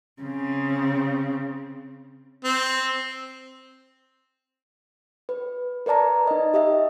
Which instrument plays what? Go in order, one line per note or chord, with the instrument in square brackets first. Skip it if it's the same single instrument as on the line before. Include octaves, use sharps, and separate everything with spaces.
[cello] C#3 C4
[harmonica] C4
[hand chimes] B4
A#4 B4 D5 A5 A#5
D#4 D#5
G4 D#5 E5